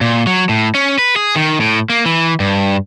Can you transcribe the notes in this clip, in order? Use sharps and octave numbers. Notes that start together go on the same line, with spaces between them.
A#2
F#3
A2
C#4
B4
G#4
D#3
A2
A#3
E3
G2